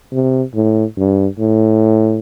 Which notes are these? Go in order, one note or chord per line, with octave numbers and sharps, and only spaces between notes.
C3
A2
G2
A2